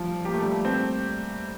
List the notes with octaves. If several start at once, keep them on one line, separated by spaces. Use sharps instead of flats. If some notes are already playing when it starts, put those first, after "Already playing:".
Already playing: F3 G3 A3
A#3 G4
A3
G3
A3
C4